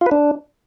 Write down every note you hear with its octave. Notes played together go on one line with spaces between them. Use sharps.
F4
B4
D4